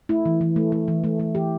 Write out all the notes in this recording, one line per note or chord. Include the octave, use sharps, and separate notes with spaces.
A3 E4
E3
E3
A3
A3
E3
A3
A3
E3 G4